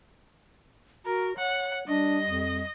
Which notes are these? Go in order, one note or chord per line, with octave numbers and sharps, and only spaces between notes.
F#4 A#4
C#5 F#5
G3 D4 D#5
F2